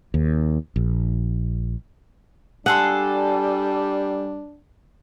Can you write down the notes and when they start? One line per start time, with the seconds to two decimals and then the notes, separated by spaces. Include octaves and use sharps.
0.14 D#2
0.76 A#1
2.66 G3 D4 G#4 A4 F#5 C6